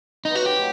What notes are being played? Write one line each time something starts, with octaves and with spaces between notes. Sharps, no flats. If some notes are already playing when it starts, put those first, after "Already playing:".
B2 F#3 C4 D#4
F#4
G4
A2 F#3